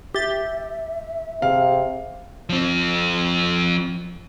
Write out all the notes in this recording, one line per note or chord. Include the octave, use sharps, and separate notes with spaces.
G4 E5 A6
C3 G#4 F5
F3 C4